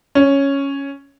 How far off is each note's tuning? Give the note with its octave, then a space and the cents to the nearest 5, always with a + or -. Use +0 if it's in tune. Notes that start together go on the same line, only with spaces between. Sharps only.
C#4 +0